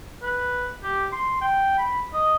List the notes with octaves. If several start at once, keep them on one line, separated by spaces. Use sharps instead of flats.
B4
G4
C6
G5
B5
D#5